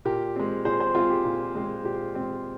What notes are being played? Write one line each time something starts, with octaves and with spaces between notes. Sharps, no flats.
A#2 G4 A#4
G#3 C4
A#2 G#4 C5
G#4 C5
G#3 C4 F4 G#4
G4
A#2
G#3 C4
A#2 G4
G#3 C4